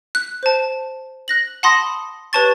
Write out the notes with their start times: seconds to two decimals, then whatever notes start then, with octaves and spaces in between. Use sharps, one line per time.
0.15 F#6
0.43 C5 A5
1.28 F#6 A#6 F#7
1.63 F#5 A5 B5 C6 D#6 A#6
2.33 G4 B4 C#5 A5 C#6 A6